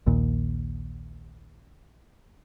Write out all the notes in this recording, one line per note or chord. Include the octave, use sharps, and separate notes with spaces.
A#1 D#2 A#2